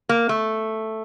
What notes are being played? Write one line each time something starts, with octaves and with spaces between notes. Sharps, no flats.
A#3
A3